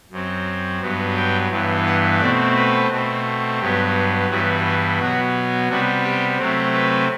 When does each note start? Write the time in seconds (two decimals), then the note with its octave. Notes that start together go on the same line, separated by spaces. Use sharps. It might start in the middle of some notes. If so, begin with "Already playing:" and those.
0.11 F#2 F#3 C4
0.81 G2 F#3 B3
1.17 G5
1.51 G2 E3 B3
1.86 F#5
2.20 B2 A3 C4 D5
2.56 B4
2.90 B2 A3 C4
3.60 G2 F#3 B3 G4
4.30 G2 E3 G3 B3 F#4
4.65 F#4
4.99 B2 F#3 B3 F#4
5.69 C3 G3 B3 F#4
6.03 G4
6.38 C3 F#3 A3 C4
6.73 B4